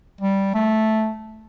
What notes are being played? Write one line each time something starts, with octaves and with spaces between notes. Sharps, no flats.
G3
A3